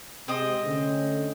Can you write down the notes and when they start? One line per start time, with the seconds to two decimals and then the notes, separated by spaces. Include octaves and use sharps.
0.28 C3 G#3 C4 D#5
0.65 D3 A3 C#4